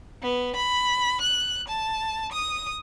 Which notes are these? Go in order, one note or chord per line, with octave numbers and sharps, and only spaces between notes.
B3
B5
F#6
A5
D#6